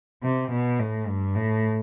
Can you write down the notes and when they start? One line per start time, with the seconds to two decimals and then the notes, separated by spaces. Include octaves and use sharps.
0.23 C3
0.51 B2
0.79 A2
1.07 G2
1.35 A2